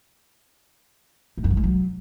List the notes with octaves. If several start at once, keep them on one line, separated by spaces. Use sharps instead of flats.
A2
F#2
C#3
G#3
F#3